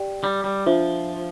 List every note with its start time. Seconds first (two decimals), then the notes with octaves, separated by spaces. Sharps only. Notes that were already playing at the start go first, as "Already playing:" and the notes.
Already playing: G4 D5 G5
0.24 G3
0.44 G3
0.66 F3 D4 F4 C5 E5